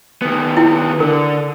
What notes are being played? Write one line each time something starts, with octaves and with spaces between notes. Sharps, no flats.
D#3 B3
E4 G5 G#5
D3 A#4